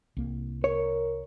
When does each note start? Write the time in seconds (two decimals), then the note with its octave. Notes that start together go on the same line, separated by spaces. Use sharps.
0.17 C2 A#3
0.64 A#4 C#5